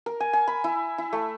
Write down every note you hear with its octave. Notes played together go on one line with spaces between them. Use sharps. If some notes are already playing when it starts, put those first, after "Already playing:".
A#4
G#5
G#5
B5
E4
E4
A3